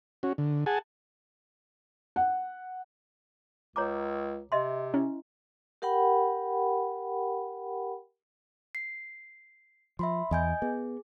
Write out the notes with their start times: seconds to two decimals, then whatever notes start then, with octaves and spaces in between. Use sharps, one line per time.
0.23 C#4 F#4
0.38 D3
0.66 G#4 F#5 G#5 A5
2.16 F#5
3.76 C#2 C#5 A#5 D6
4.52 C3 D#5 E5 C6
4.94 C#4 E4
5.82 G4 A#4 F#5 G5 B5
8.75 C7
9.99 F3 E5 B5 C6
10.31 E2 D#5 G#5 G6
10.62 B3 G#4